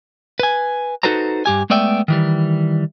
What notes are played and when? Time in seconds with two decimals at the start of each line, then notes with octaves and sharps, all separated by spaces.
0.40 B4 G#5
1.03 D#4 F#4 A4 B4 C5 A#5
1.46 G2 G4 G#5
1.70 G#3 A3 B3 D5 E5 G5
2.08 D#3 E3 G3